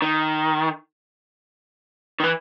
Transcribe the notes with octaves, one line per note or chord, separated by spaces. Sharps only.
D#3
D#3
E3